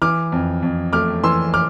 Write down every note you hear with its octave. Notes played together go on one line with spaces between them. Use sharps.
E3 D6 F6
F2
F2
A3 D6 F6
E3 C6 E6
D6 F6